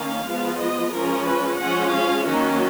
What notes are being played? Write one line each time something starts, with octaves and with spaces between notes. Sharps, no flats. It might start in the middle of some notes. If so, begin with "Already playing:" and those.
Already playing: D#3 A#3 C#4 F5
F3 G#3 B3
D#5
F3 G#3 C#4 A#4
B4
F3 G#3 C#4 F#5
F5
D#3 F#3 A#3 C#4 F#4